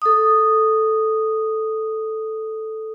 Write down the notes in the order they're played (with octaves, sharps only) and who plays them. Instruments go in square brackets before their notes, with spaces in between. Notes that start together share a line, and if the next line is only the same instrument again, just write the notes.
[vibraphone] A4 D#6